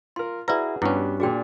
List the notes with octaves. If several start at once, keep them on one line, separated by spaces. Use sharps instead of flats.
F4 A#4 C6
E4 F#4 G#4 B4 D5 A#5
G2 B3 C#4 E4 F#4 G4
A#2 D4 F#4 G#4 G5